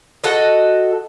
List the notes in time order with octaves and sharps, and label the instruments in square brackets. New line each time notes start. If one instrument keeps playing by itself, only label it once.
[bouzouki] F#4 A4 D#5